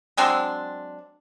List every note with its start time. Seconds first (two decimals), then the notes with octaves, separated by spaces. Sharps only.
0.17 F#3 G#3 C4 D4